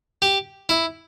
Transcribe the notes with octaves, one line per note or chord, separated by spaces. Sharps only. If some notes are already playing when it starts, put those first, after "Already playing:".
G4
E4